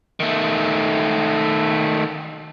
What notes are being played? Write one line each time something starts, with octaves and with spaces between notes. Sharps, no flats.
D#3 A3